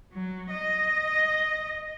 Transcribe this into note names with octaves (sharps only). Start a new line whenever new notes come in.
F#3
D#5